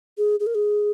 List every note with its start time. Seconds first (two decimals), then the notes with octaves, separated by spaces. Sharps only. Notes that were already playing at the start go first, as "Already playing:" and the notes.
0.18 G#4
0.40 G#4
0.46 A#4
0.55 G#4